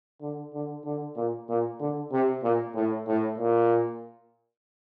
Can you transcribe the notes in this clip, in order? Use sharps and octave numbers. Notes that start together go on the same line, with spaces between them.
D3
D3
D3
A#2
A#2
D3
C3
A#2
A2
A2
A#2